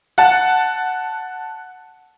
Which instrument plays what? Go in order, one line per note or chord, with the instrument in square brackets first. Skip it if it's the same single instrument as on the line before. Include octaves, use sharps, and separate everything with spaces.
[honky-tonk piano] F#5 A5